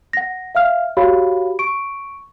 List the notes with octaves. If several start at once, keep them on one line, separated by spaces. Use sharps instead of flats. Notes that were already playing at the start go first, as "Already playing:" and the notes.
F#5 A#6
E5 F5 F6
F#4 G4 C#5 F5 B5
C#6 D7